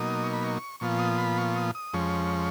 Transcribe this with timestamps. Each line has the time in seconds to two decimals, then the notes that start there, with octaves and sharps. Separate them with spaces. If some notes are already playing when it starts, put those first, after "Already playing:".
Already playing: B2 F#3 A#3 D#4 D#6
0.24 C#6
0.33 B5
0.44 C#6
0.80 A#2 F3 B3 F4 C#6
0.99 D#6
1.18 B5
1.38 C#6
1.56 D#6
1.75 D#6
1.93 F2 F3 G#3 C#4 C#6